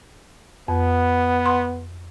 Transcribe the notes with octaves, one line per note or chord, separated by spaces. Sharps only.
F2 B3
C6